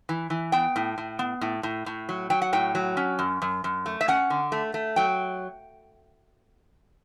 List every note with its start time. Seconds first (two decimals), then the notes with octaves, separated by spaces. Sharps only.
0.09 E3
0.30 E3
0.52 B3 G5
0.76 A2
0.98 A2
1.19 B3
1.41 A2
1.63 A2
1.86 A2
2.09 F#3
2.30 F#3 G5
2.42 F#5
2.53 A2 G5
2.75 F#3
2.97 C#4
3.19 F#2
3.42 F#2
3.64 F#2
3.86 A3
4.01 E5
4.08 C#4 F#5
4.30 D3
4.52 A3
4.74 A3
4.96 F#3 G5